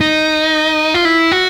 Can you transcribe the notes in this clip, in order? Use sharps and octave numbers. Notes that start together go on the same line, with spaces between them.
D#4
F4
E4
F#4